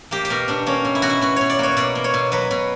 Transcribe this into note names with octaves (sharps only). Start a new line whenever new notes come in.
A#3 G4
G4
B2 A#4
B2 D4
A#3 C#4
B2
E4
B2 F#4
E4
B2 F#4
B2 C#5
D5
A#3 C#5
B2 D5
A#3
C#5
B2
F#3 B4
B2